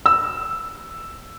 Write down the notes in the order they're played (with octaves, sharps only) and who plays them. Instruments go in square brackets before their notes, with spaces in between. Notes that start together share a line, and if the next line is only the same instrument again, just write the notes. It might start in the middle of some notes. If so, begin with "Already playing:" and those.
[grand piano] E6